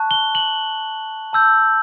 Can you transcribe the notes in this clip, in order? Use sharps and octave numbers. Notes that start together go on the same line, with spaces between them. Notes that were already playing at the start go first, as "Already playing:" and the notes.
Already playing: A5 C#6 F#6
G7
F#7
A5 E6 G6